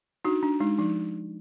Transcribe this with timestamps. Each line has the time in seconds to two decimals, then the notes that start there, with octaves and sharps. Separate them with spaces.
0.25 D4 D#4 F#4
0.43 D4
0.60 G#3 D#4
0.78 F3 D#4